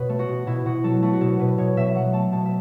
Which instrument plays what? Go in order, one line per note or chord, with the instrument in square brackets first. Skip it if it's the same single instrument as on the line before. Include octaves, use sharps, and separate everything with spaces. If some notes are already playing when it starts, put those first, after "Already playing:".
Already playing: [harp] B2 B4 C#5
A3
F#4
B2
B2 E4
B2 F#4
F#3 A4
A3 F#4
F#4
B2 A4
B2 B4
B2 C#5
B2 E5
E5
F#3 F#5
A3 A5
B2 A5
E5